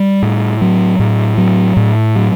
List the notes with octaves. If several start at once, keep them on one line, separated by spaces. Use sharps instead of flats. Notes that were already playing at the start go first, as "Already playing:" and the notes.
Already playing: G3
A2
F#3
A2
F#3
A2
F#3